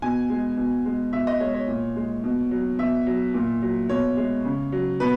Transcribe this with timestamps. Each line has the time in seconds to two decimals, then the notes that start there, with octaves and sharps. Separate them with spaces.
0.02 B2 G#5
0.30 G#3
0.57 B2
0.85 G#3
1.13 B2 E5
1.27 D#5
1.40 G#3 C#5
1.54 C#5
1.68 A#2
1.96 G#3
2.24 B2
2.51 F#3
2.79 B2 E5
3.06 F#3
3.34 A#2
3.62 F#3
3.89 B2 C#5
4.17 G#3
4.45 C#3
4.72 F#3
5.00 B2 B4